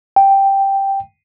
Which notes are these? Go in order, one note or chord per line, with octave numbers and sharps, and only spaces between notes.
G5